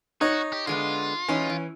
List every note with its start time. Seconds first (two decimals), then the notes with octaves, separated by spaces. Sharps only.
0.21 D#4 F#4 C#5
0.53 G4
0.67 D3 G#3 B3 F4
1.28 E3 G#3 C#4 D#4
1.50 E3